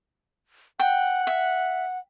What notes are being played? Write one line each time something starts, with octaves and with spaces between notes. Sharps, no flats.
F#5 G5
E5